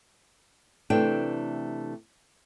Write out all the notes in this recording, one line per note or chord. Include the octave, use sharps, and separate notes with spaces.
C3 E3 A3 D4 G5